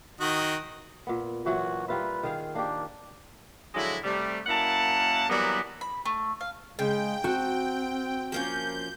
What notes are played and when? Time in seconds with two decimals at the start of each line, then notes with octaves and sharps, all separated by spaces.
0.20 D#3 F#4 D#5
1.07 A#2 B3
1.46 A#2 E3 F#3 F#4
1.88 G3 F4 B4 E5
2.23 D#3 G#4 F5
2.55 A#3 D4 G4
3.75 D3 F3 F#3 G#3 E4
4.04 C3 G3 A3
4.47 F#2 A#3 E4 F#5 A5
5.29 E3 F#3 G3 A#3 B3 E4
5.81 B5
6.05 A3
6.41 F5
6.79 C#3 G#3 G5
7.24 C4 F#4 A5
8.32 F3 A#3 C#4 G6